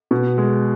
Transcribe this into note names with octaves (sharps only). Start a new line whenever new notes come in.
B2
G#3